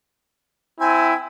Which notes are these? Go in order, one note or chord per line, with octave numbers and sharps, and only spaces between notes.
C4 E4 G#5